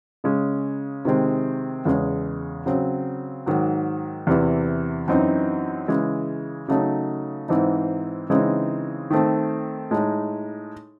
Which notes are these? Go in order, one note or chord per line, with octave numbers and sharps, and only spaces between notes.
C#3 G#3 C#4
C3 D#3 G#3 C4
E2 C#3 G#3
C#3 F#3 C4
G#2 D#3 F#3
E2 C3 E3
F#2 E3 C4 D#4
C#3 E3 G#3
C#3 F#3 A3 D#4
G#2 E3 C4 D#4
C#3 E3 G#3 C4 D#4
D#3 A3 C4
A2 G#3 D#4